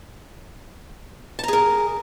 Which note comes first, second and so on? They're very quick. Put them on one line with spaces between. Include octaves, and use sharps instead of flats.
A5 A#5 G#4 A#4